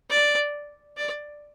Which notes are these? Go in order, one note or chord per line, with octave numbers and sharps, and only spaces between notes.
D5
D5